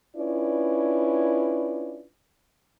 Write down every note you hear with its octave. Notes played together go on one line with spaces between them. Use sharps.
C#4 D4 E4 F4 B4 D5